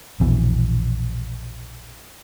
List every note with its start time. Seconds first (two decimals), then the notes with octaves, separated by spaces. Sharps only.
0.20 A#1 E2 B2